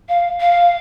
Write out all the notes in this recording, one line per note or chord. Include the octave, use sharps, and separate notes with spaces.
F5
F5